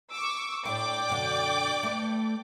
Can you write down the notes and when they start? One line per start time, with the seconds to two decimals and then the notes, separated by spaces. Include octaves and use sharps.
0.10 C#6 D6 E6
0.65 A2 D4 E4 D5 G5 D6
1.09 F#2 B2 D3
1.83 A3 B4